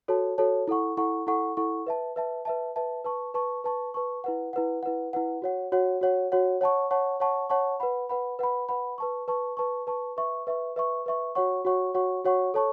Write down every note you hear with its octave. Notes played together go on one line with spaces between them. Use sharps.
F#4 A4 C#5 A5
F#4 A4 C#5 A5
E4 A4 F#5 C#6
E4 A4 F#5 C#6
E4 A4 F#5 C#6
E4 A4 F#5 C#6
B4 E5 A5
B4 E5 A5
B4 E5 A5
B4 E5 A5
B4 A5 C#6
B4 A5 C#6
B4 A5 C#6
B4 A5 C#6
E4 B4 F#5
E4 B4 F#5
E4 B4 F#5
E4 B4 F#5
F#4 C#5 F#5
F#4 C#5 F#5
F#4 C#5 F#5
F#4 C#5 F#5
C#5 F#5 A5 C#6
C#5 F#5 A5 C#6
C#5 F#5 A5 C#6
C#5 F#5 A5 C#6
B4 F#5 B5
B4 F#5 B5
B4 F#5 B5
B4 F#5 B5
B4 A5 C#6
B4 A5 C#6
B4 A5 C#6
B4 A5 C#6
B4 E5 C#6
B4 E5 C#6
B4 E5 C#6
B4 E5 C#6
F#4 C#5 F#5 C#6
F#4 C#5 F#5 C#6
F#4 C#5 F#5 C#6
F#4 C#5 F#5 C#6
A4 C#5 A5 C#6